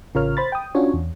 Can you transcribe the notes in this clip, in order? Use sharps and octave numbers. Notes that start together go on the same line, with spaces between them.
A1 C#3 F4 A#4 C#5 F6
C5 B5 A6
G5 D#6
C#4 D4 F4 F#4 C#5
E2